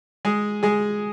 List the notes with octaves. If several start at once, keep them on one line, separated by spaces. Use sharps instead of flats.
G#3 G#4
G#3 G#4